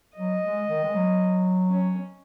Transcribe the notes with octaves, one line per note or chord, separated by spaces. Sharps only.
F#3 D#5
G#3
D#3
G#3
F#3
C#4